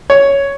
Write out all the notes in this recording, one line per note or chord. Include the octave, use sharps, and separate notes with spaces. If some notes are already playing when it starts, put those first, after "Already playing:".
C#5